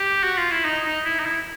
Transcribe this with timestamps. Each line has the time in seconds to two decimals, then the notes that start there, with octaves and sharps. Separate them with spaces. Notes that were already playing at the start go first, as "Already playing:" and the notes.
Already playing: G4
0.23 F#4
0.37 F4
0.51 E4
0.65 D#4
0.85 D#4
1.05 E4
1.19 D#4
1.26 E4